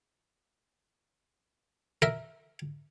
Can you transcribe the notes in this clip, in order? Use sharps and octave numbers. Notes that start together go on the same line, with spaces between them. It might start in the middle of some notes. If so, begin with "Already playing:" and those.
A#4 E5